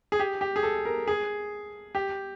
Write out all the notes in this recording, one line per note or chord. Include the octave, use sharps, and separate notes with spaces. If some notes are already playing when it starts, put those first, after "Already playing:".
G#4
G4
G4
G#4
A4
A#4
G#4
G4